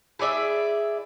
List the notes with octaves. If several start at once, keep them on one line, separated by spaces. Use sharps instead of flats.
E4 G#4 D5 E5